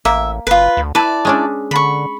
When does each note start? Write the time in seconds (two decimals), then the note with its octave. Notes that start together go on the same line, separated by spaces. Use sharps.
0.05 A1 A#3 E5
0.47 F#1 F4 B4
0.77 D2
0.95 E4 B4 D5 A5
1.25 G#3 C#4 D4
1.71 D3 B5 C#6